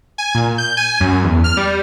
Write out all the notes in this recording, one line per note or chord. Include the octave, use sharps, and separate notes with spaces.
G#5
A#2
G6
G#5
F#2
E2
F6
G3